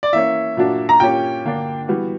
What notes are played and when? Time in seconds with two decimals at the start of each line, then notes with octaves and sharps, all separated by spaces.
0.03 D5
0.13 E3 A#3 C#4 E5
0.57 A#2 F#3 A#3 D4 F#4
0.89 A#5
1.00 A#2 A#3 C#4 G4 G5
1.45 D3 A#3 D4
1.88 E3 G3 B3 F#4